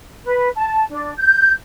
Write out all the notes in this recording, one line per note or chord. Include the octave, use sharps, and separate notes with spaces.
B4
A5
D4
G6